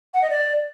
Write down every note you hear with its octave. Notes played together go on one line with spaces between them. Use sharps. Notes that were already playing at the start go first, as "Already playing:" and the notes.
F#5
D#5
D5